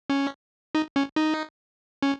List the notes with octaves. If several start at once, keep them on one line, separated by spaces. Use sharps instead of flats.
C#4
D#4
C#4
D#4
C#4